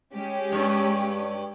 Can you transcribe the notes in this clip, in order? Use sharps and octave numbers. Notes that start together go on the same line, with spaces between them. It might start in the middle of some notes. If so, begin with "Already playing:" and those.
G#3 C#4 G4
G2 C#5